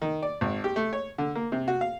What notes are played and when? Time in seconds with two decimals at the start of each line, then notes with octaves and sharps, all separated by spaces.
0.02 D#3
0.23 D5
0.41 G#1
0.64 G4
0.76 A3
0.93 C#5
1.18 D3
1.35 A#3
1.52 C3
1.68 F#4
1.81 F5